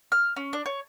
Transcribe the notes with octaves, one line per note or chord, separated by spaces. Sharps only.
F6
C#4
D4
C#5